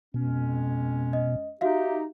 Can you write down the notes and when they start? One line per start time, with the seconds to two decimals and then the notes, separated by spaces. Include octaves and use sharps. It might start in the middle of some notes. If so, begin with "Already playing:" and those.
0.14 F2 B2 G#3 C#4
1.13 D#5
1.61 D#4 F#4 G4 E5 F5